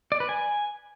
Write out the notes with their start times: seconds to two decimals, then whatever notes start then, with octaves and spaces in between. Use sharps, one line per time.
0.12 D5
0.20 B4
0.29 G#5